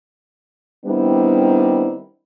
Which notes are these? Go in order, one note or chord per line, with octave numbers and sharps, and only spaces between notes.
D#3 G3 B3 C4 D4 E4